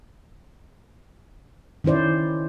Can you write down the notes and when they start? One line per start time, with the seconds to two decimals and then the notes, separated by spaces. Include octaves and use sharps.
1.84 D#3 C#4 E4 C5 D5